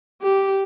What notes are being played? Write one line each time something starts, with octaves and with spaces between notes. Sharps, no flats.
G4